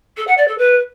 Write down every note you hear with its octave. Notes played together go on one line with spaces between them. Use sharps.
A4
F#5
D5
A4
B4